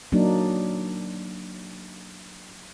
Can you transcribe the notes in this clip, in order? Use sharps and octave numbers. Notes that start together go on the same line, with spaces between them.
F#3 A#3 D4 D#4